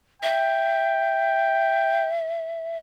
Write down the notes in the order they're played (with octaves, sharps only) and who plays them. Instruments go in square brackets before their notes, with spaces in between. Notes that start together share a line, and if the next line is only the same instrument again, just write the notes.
[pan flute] E5 [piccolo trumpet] G5